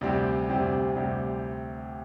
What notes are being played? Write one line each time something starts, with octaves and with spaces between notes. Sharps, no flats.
D2 C3 G3 C4 G4
D2 C3 G3 C4 G4
D2 C3 G3 C4 G4